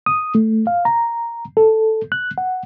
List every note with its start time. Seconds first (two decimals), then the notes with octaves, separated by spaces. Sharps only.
0.06 D#6
0.35 A3
0.67 F5
0.85 A#5
1.57 A4
2.12 F#6
2.38 F#5